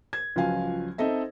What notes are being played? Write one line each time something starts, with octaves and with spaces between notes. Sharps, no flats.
G#6
C#2 F3 F#3 F5 G#5
C4 D#4 A4 D#5 E5